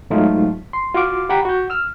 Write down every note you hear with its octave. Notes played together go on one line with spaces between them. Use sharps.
G#2 F#3 A3 D#4 F4
C6
F4 F#4 F5 D6
G4 F#5 G5 A#5 B5
F#4 G6
E6 F6